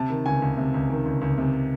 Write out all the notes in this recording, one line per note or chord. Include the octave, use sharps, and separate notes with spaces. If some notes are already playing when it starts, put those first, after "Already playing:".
Already playing: C3 A5
D#3
C#2 G#5
C#2
C3
C#2
D#3
C#2
C#2
C3